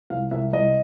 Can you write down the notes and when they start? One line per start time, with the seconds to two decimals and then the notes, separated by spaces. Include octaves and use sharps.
0.10 C2 F5
0.31 C2 E5
0.53 C2 D#5